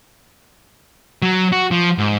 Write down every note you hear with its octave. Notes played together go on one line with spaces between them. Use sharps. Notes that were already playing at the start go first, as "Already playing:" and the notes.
F#3
F#4
F3
G#2